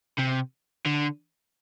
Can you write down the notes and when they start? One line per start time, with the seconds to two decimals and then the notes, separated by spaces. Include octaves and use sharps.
0.18 C3
0.86 D3